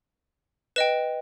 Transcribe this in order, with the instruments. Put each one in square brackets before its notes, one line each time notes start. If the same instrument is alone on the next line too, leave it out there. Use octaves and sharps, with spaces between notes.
[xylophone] B4 D#5 G5 E7